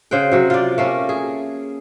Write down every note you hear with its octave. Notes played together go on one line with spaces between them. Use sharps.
C#3 C5 F#5 G5
C3 F#3
F4 D5
A3 A#3 C#4
G#4